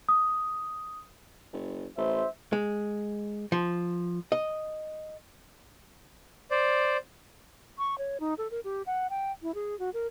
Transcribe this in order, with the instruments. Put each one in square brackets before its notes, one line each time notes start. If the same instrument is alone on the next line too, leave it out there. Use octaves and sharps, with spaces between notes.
[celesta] D#6
[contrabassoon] F#1
[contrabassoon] A1 [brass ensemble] C5 E5
[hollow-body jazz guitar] G#3
F3
D#5
[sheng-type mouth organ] C5 D5
[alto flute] C#6
C#5
D#4
A4
A#4
G4
F#5
G5
E4
G#4
F#4
A#4